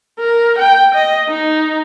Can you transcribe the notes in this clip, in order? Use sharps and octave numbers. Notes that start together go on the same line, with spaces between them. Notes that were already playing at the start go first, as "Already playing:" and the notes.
A#4
G5
D#5
D#4